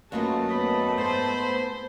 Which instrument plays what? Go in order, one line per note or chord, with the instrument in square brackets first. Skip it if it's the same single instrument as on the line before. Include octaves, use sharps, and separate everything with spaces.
[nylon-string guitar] F#2 A#3 B4 [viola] A3 A5 [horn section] F4 F#4 D#5
[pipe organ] B3 B5 [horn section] D#5
[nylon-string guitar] G#2 [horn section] C5